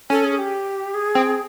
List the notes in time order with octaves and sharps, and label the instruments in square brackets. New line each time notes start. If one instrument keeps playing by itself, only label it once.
[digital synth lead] C#4 [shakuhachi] A4
[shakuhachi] G#4
G4
G#4
[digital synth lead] C4